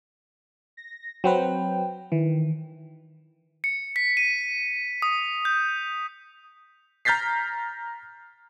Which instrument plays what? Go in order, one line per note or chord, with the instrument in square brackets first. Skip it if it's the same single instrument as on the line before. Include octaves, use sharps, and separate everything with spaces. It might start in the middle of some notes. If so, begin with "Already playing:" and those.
[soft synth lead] A#6
[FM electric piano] F#3 C4 B4 [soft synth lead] G5
[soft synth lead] D#3 [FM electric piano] E3
[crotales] C#7
B6
D#7
D#6
G6
[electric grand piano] A#5 F6 G6 A6 B6 C7